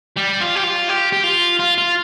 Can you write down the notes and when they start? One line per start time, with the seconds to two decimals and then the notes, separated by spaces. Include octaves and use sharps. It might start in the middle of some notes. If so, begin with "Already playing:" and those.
0.17 G3
0.41 F4
0.56 G4
0.64 F4
0.89 G4
1.13 G4
1.23 F4
1.60 F4
1.78 F4